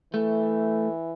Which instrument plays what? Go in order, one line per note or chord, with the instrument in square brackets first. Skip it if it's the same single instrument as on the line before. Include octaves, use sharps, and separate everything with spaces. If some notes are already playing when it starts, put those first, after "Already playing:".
[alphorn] E3 [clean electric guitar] A3